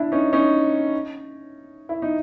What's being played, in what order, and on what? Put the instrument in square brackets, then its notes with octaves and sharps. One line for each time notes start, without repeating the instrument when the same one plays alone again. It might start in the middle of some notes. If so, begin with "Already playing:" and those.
Already playing: [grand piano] D4 E4
C#4 D#4
C#4 D#4
E4
D#4